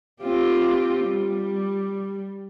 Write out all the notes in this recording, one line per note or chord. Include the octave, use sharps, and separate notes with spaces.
C4 F4 G4
G3